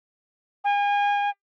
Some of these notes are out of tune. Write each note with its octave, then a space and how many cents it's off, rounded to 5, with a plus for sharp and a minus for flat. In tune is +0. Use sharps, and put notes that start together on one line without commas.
G#5 -35